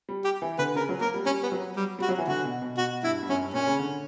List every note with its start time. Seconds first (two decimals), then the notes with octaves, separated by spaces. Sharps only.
0.09 G3
0.25 G4
0.42 E3
0.59 D3 B4
0.75 C#3 A#4
0.89 F#3
1.01 A#3 A#4
1.14 G3
1.26 G3 C#4
1.43 B3
1.52 F#3
1.77 G3
1.99 G3 F#4
2.09 F#3
2.18 E3
2.28 D3 F#4
2.44 B2
2.62 B2
2.78 B2 F#4
3.03 G2 E4
3.23 G2
3.29 F#2 C#4
3.42 G2
3.54 A#2 C#4
3.67 C#3
3.79 D3